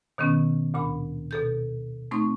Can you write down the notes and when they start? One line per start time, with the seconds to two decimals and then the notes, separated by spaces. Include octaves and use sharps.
0.18 B2 D#3 B3 C#4
0.74 D2 A#2 B5
1.31 B2 A4 G6
2.11 A3 C4 D#4 C#6